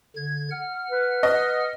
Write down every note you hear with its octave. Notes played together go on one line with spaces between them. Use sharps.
D3 G#6
F#5 F6
B4
D#5